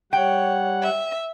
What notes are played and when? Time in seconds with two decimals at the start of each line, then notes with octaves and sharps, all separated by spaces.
0.13 G3 C#5 F#5 G5
0.82 E5